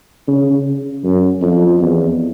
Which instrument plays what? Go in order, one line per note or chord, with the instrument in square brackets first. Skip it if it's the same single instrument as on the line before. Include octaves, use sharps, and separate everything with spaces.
[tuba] C#3
F#2
F2
E2